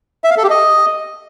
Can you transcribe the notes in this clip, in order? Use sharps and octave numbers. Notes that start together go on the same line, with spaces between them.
E5
F5
A4
G4
D#5